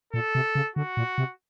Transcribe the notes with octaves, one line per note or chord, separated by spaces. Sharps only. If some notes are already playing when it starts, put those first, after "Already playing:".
A#2 A4
C3
C#3
D3 F#4
A#2
C3